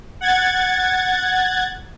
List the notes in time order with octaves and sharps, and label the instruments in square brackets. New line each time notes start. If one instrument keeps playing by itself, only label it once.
[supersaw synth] F#5 G#6 A6